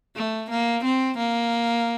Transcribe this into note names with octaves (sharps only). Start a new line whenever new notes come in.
A3
A#3
C4
A#3